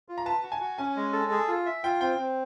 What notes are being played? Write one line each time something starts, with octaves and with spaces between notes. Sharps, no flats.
F4
A#5
B4 A5
F#4
G#5
F#4
C#4 G#5
G#3
A4
G#4
F4
E5
F4 G5
C4 G5
C4